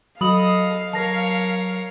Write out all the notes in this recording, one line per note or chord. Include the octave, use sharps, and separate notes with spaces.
F#3 A4 D#5 F5 B5 D#6 F#7
A#4 C#5 A5 A#6